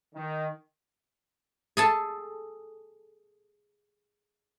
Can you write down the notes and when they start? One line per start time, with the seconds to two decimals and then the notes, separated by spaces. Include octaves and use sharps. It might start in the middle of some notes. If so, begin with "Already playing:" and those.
0.14 D#3
1.77 G#4 A4 A5